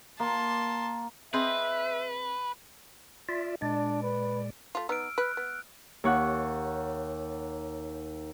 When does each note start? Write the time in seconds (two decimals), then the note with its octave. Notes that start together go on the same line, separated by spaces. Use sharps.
0.20 A#3 A5 C6
1.34 C4 G#4 B4 D#5 E5
3.29 F4 D5 E5
3.62 A#2 G#3 D4 D5
4.03 B4
4.75 A3 F4
4.89 B3 D#4 E6 F6 D7
5.18 B4 F6 F#6
5.37 B3
6.04 D#2 C#5 F#5